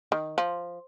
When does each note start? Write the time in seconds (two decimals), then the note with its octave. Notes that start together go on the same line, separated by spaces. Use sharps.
0.12 D#3
0.38 F3